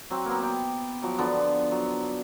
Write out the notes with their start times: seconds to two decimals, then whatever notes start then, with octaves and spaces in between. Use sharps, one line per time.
0.10 F#3 C4
0.26 A#3 B3
0.42 B3 G5
1.02 F3 F#3 D6
1.18 D3 F3 B3
1.71 F#3